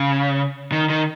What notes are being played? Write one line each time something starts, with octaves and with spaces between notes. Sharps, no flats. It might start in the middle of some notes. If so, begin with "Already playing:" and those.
Already playing: C#3
D#3
D#3